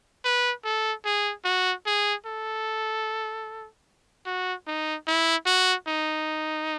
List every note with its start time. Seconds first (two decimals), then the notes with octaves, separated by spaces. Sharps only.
0.25 B4
0.65 A4
1.05 G#4
1.45 F#4
1.86 G#4
2.26 A4
4.26 F#4
4.67 D#4
5.07 E4
5.47 F#4
5.88 D#4